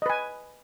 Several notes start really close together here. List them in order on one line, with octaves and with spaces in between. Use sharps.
D#5 B4 G#5